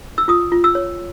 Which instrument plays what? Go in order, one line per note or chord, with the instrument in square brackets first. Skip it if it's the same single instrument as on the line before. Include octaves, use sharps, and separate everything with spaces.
[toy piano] E6
F4 D#6
F4
E6
C#5